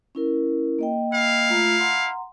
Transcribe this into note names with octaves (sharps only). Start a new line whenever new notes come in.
C#4 E4 A#4
A#3 D#5 G5
E4 F5
A3 F4 A#5
F#5 A#5 C6